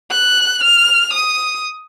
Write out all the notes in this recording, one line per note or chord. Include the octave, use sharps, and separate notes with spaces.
F#6
F6
D#6